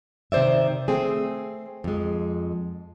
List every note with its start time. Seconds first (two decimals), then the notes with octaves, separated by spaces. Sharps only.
0.32 C3 D#3 C5 D5 E5
0.88 A3 C4 G#4
1.84 F2 G#3